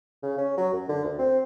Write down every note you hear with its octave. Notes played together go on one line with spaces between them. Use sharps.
C#3
C#4
F#3
F#2
D3
D2
C4